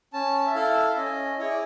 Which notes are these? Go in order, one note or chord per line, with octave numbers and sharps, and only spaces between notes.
C#4 A5
E5
E4 A4 F5
E5
C#4 D#5
E4 G#4 C#5
D5